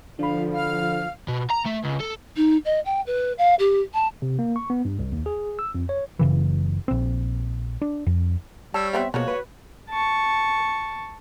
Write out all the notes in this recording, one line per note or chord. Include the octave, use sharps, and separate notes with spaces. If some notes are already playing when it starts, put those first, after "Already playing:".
D3 F3 D4 F5 B5
F5 F6
B2
A#5
A3
C#2
A4
D#4
D#5
G5
B4
F5
G4
A5
C3
A#3
C#6
B3
G2
C2
D#2
G#4
E6
F2
C#5
F#1 C#3 E3
A#1 C4
D4
F2
G3 C#5 A5 E6
B3 C4 G4 E5
B2 F3 G#3 A#3 F#4 C#5
B4
A5 C#6